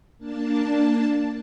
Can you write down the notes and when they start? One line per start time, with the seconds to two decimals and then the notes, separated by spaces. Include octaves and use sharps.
0.18 A#3 D4 A5